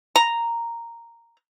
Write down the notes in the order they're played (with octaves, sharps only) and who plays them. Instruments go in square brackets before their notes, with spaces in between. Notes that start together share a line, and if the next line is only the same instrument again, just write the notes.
[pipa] A#5